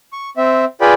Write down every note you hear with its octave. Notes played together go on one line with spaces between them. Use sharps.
C#6
C4 E5
F4 G#4 B4 D5 G5 B5